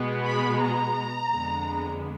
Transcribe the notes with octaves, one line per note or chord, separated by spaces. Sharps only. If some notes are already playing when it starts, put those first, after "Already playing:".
Already playing: B2 G#3 B3
B5
A#5
F2 D3 G#3 B3